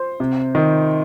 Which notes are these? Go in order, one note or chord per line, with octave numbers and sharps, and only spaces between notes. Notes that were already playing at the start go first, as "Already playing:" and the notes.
Already playing: C5
C3
D#3